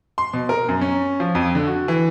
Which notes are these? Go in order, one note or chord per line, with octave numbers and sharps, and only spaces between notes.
C6
B2
A#4
F#2
C#4
F3
F2
D3
F#4
E3